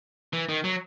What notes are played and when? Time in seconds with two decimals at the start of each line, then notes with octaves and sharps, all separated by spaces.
0.33 E3
0.49 D#3
0.64 F#3